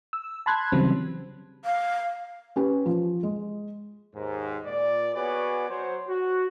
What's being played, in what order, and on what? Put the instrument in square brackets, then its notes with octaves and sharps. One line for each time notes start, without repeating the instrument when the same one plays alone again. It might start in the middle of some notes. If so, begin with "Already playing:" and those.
[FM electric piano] E6
A5 B5 C6 F#6 G#6
C#3 E3 F#3 G3 C4
[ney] F5
[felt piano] C#4 G4 B4
F3
G#3
[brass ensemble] D#2 G#2
A#2 D5
B3 F#4 G#4 B4 C#5 D5
F#3 C5 C#5
F#4